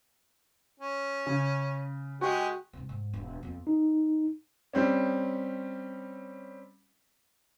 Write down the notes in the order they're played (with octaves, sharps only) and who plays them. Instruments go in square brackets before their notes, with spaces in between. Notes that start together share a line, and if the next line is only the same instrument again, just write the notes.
[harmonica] C#4
[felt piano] C#3
[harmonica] G#3 G4 G#5 [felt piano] F#4
[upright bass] G#2 C3
G#2
E1
F2 B3
[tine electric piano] D#4
[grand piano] G3 C4 C#4